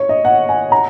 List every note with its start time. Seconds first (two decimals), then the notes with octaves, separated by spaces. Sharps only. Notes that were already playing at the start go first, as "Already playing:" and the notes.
Already playing: C#5
0.09 D#5
0.25 F#5
0.49 G#5
0.72 A#5